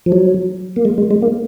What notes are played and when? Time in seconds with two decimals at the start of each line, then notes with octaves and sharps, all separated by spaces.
0.06 F3
0.12 F#3
0.76 A#3
0.85 G#3
0.98 G#3
1.11 G#3
1.22 A#3